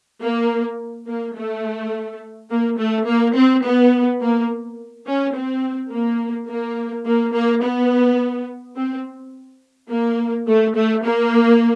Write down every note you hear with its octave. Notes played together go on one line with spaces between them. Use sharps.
A#3
A#3
A3
A#3
A3
A#3
C4
B3
A#3
C#4
C4
A#3
A#3
A#3
A#3
B3
C4
A#3
A3
A3
A#3